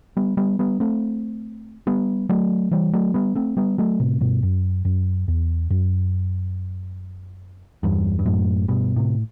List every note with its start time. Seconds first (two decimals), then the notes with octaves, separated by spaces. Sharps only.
0.17 G3 B3
0.37 G3 B3
0.59 G3 B3
0.80 A3 C4
1.87 G3 B3
2.29 F#3 A3
2.71 E3 G3
2.93 F#3 A3
3.14 G3 B3
3.35 A3 C4
3.57 G3 B3
3.78 F#3 A3
4.00 A2 C3
4.21 G2 B2
4.43 F#2
4.85 F#2
5.28 E2
5.70 F#2
7.83 E2 G2
8.19 G2
8.26 F#2 A2
8.68 G2 B2
8.96 A2 C3